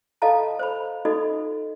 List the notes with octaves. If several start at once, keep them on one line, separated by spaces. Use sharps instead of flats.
F4 A4 D#5 F5 A5 A#5
C5 B5
D#4 F4 F#4 A4 D#5